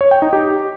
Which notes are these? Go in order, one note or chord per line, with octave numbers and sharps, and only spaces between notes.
C#5
G5
D#4
G4